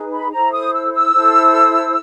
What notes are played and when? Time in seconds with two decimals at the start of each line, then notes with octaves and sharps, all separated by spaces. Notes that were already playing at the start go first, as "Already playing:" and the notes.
Already playing: D#4 G#4 B4
0.12 B5
0.32 E4 A4 C5 A#5
0.53 D#6
0.73 E6
0.93 E6
1.13 E4 A4 C5